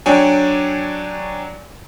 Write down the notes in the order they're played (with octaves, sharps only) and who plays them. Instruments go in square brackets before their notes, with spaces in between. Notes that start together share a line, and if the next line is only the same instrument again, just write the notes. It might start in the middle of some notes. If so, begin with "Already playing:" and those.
[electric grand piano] F#3 D4 C#5 G5 G#5